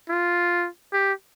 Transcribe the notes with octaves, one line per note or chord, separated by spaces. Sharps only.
F4
G4